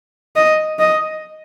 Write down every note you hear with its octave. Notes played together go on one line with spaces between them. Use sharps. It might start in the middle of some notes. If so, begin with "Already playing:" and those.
D#5
D#5